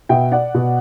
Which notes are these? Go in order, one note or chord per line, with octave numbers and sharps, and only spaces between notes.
B2 E5 G5
D5 F#5
B2